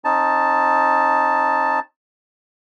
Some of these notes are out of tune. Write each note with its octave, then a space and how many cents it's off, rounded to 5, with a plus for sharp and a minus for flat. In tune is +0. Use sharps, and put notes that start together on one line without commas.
C4 +45 D#4 +0 A5 +0